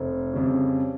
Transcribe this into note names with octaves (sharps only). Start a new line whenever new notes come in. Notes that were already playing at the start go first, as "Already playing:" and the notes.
Already playing: F1 C5
F2 C#3 G3